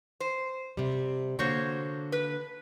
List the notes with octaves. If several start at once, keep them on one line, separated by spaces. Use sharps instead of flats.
C5
C3 G3
D3 A#3 F#4 C5 C#5
B4